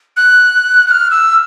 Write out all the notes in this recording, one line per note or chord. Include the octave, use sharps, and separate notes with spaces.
F#6
F#6
F6
E6